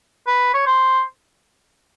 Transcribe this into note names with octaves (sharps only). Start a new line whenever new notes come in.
B4
C#5
C5